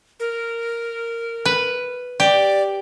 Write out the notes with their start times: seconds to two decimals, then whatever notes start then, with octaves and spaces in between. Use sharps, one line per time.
0.20 A#4
1.45 B4
2.20 G4 D5